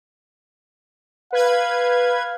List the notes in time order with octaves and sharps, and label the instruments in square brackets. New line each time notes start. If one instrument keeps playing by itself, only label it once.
[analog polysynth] B4 G#6 [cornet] F5